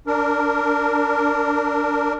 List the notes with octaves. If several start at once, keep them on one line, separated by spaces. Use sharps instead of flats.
D4 A#4